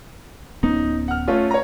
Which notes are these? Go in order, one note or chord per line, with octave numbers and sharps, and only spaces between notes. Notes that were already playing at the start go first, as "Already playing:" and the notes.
D1 B3 C#4 D#4
F#5 F6
A3 C#4 F4
C#5 A#5